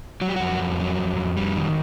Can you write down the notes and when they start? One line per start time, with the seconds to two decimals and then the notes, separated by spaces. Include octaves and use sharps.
0.21 F#3 F#4
0.29 G4
0.36 F2 F#4
0.59 F2
0.79 F#3
0.99 F2
1.18 F2
1.37 G3
1.56 D#3